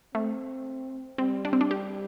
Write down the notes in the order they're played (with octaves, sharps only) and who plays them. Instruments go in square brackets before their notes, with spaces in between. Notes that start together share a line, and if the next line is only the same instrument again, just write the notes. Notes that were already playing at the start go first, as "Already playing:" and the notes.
[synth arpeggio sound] A3 [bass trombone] C4
[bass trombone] G3 [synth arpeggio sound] C4
[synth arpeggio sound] D4
C4
D4
G4